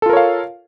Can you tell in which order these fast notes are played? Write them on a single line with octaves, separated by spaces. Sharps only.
A4 F4 A#4 C#5 F5